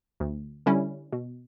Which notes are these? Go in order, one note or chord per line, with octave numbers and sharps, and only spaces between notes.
D2
D3 G3 C#4 E4
B2